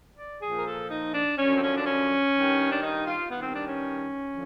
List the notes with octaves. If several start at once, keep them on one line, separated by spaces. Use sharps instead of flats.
D5
A#2 F3 G#4
A#4
A4
D#4
D4
F#2 D3 F3 C#4
C4
C#4
D4
C#4
G2 D#3
D4
D#4
F4
G2 D#3 B3
C4
D4
C#4
D3 F3